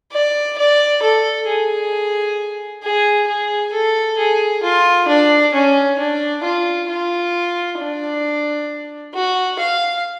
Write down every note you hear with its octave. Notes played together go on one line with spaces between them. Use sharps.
D5
D5
A4
G#4
G#4
G#4
A4
G#4
F4
D4
C#4
D4
F4
F4
D4
F#4
F5